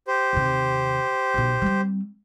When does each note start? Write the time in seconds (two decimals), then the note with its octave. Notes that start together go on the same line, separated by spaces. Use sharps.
0.07 G4 C5
0.33 D#2 C3
1.34 B1 B2
1.62 G3 C4